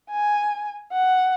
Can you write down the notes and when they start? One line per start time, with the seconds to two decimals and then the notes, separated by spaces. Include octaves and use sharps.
0.11 G#5
0.93 F#5